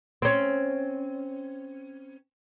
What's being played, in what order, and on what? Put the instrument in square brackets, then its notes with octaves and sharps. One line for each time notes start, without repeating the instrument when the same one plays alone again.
[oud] C4 C#4